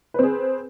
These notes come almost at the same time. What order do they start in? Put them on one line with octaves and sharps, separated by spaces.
B4 C4 G#4